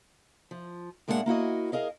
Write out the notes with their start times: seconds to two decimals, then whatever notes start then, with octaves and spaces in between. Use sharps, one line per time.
0.51 F3
1.08 A2 G#3 A#3 D4 G4 F#5
1.26 A#3 E4 F#4 D#5
1.72 G#4 A#4 D#5 F5